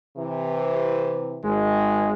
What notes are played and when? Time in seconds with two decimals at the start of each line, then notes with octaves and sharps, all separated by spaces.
0.17 C3 E3
1.43 G#1 G#3